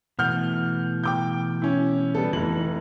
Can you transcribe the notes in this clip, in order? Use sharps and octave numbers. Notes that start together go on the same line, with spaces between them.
B2 E3 A3 F#5 F6 G6
G5 D6 G6
C#4 E4
G3 B3 A4
F1 E3 D#4 F#7